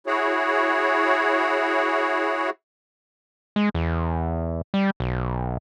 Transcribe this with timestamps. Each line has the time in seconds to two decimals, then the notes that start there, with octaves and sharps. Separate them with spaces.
0.07 E4 F#4 G#4 C#5
3.56 G#3
3.74 E2
4.74 G3
5.00 B1